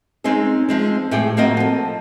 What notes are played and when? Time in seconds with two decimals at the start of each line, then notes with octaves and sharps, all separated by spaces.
0.24 G#3 C4 C#4 D#4 G#4
0.69 F3 G#3 C4
1.11 A2 G4 G#4 G5
1.37 F3 A#3 C4 F#4 D#5
1.57 F3 A4